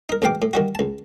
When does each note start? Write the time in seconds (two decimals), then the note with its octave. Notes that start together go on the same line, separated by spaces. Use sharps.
0.09 D#4 A#4
0.22 A1 G#2 B2 F5 G5 D6
0.42 A2
0.53 D#3 G3 F#4
0.75 C#2 A5